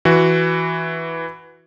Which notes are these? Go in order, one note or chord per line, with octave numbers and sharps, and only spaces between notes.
E3 F#4